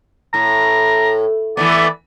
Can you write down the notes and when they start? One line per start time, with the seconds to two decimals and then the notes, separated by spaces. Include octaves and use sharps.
0.34 A2 A#5
1.57 E3 A3 B3 D5